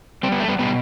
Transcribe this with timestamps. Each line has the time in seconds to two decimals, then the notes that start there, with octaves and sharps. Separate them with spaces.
0.23 G3 C4
0.32 B3
0.40 A3
0.48 G3 B3
0.59 B2 G3 B3